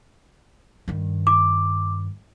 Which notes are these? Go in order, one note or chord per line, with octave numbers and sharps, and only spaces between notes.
G2 D#3
D6